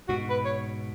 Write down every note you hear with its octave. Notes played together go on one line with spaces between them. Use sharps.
G#2 B2 F#4
B4
C#5